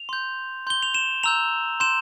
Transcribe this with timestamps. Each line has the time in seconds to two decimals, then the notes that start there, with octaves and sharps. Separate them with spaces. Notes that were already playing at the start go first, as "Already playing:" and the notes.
Already playing: F7
0.09 C6 G6
0.67 C6 G6 G7
0.83 F7
0.95 E7
1.23 A#5 E6 G6 F7
1.80 C6 G6 E7